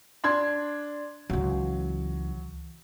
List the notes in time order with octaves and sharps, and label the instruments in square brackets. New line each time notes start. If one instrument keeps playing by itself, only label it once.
[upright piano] D4 C6 G#6
[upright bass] C#2 E3 [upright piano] F#3